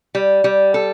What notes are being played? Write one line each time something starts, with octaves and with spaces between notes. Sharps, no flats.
G3
G3
A4